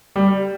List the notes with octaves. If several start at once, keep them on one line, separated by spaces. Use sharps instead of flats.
G3